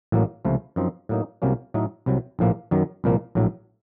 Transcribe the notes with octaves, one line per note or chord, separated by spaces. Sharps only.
A1 A2 F#3 A#3
C#2 C3 F3 A3
F#2 F3 C4 D#4
A2 F#3 A#3 D#4
C2 C3 F#3 A#3 C#4
A2 F#3 A3 D#4
C2 C3 F#3
A#1 A2 F3 A#3
F#2 D#3 F#3
C2 A#2 F3 A#3
A#1 A2 F#3